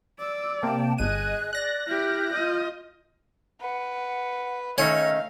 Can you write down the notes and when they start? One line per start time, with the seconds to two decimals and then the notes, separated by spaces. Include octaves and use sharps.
0.19 D5 E6
0.63 C3 A#3 G5 A5
0.98 G1 G#4 D#5 F#6 D#7
1.53 D5 F#6 A#6
1.88 E4 G4 F6 G6
2.34 F4 D#5
3.61 B4 F#5
4.78 D#3 A3 C#4 C#5 D#5 F5